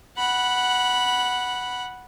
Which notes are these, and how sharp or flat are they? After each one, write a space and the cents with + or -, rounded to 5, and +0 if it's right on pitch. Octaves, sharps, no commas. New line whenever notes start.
F#5 +0 B5 -10